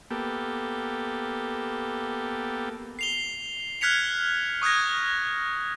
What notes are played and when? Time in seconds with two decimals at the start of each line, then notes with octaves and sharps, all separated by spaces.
0.10 A#3 B3 G4 A4
2.99 C7 F7 G7
3.81 F6 F#6 G#6 B6 C#7 F7
4.62 C#6 D#6 F#6 G#6 A#6